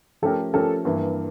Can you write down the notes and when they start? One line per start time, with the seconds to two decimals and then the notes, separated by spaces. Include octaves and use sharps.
0.22 F3 A3 C#4 G4 A4 A#4
0.53 F3 A3 C#4 G4 A4 A#4
0.85 G2 E3 A#3